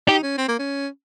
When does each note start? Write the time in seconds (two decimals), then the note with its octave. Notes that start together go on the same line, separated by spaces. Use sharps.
0.08 D#4 G4
0.23 C#4
0.38 C4
0.48 A#3
0.59 C#4